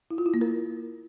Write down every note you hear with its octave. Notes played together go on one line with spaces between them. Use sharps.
E4
F4
E4
A#3
A#4